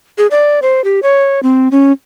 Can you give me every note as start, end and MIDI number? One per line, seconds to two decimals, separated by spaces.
0.18 0.27 68
0.31 0.60 74
0.62 0.84 72
0.84 1.00 67
1.03 1.40 73
1.43 1.69 60
1.71 1.92 61